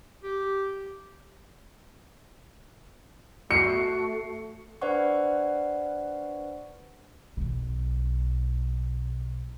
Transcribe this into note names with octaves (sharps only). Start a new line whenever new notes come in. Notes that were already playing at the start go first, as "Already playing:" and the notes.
G4
A3 F#4 C7 C#7
D4 B4 C5 D5 F#5 C#6
B1 B2